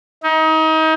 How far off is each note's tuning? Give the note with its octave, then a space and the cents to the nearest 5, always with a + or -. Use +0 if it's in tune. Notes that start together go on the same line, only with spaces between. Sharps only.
D#4 +30